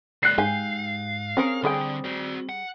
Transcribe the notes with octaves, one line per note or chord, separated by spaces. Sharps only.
G#3 D5 F#6 C7
G#2 G4 F5 G#5
C4 C#4 G#4 A#4
D3 G3 G#4 G5
F#4 D5
F#5